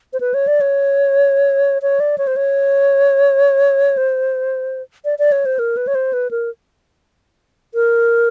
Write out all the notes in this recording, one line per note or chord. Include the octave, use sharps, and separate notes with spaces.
C5
B4
C#5
D5
C#5
C#5
D5
C#5
C5
C#5
C5
D5
D5
C#5
C5
A#4
B4
C#5
C5
B4
A#4
A#4